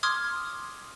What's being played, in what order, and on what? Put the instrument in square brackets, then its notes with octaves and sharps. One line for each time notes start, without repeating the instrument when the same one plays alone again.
[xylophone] C6 D6 D#6 F6 G#6